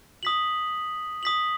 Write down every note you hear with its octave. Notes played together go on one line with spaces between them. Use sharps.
D#6 B6 F#7
D#6 B6 F#7